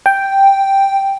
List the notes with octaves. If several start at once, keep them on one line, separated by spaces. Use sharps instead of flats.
G5